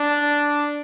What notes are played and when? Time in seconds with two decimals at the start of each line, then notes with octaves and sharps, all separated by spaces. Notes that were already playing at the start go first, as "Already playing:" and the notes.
Already playing: D4